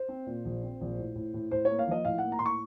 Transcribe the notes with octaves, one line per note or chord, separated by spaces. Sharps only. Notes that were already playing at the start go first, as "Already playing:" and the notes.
Already playing: C5
C4
A#2
A#1
C4
A#1
A2
A2
A2
A2 C5
A#3 C#5
F5
F3 D#5
A2 F5
A#3 F#5
A#5
A2 C6
C#6